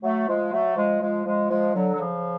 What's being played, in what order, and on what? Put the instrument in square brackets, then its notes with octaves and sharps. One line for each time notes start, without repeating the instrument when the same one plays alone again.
[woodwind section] F#3 A3
F3 G#3
F#3 A3
F3 G#3
F3 G#3
F3 G#3
F3 G#3
D3 F#3
F#3
C#3 F3